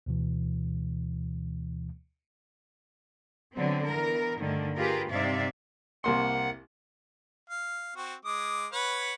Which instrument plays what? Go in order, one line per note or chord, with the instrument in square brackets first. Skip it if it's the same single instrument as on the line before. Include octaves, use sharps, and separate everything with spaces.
[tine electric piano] D2 B2 E3
[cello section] D3 F#3 B3 C4
E3 B3 A#4
G2 D3 D#3 A3
F4 G4 G#4 A#4 B4
G2 C3 D#4 D5 E5 F5
[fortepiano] C2 A#3 C6 [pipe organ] F#5
[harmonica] F5
C4 F#4
G#3 D6 D#6
B4 C#5 F#5